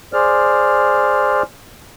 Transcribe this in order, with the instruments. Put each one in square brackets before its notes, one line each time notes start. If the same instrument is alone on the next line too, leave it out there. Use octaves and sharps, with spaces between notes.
[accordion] G#4 C5 D5 F6